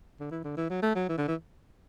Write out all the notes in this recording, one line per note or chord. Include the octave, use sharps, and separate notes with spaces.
D3
E3
D3
E3
F#3
A3
F#3
E3
D3
E3